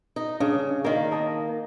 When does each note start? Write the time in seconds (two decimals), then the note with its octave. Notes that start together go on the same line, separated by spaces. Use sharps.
0.16 D#4
0.40 C#3 D4
0.84 D#3 A#3 D5
1.12 D#5 A5 D#6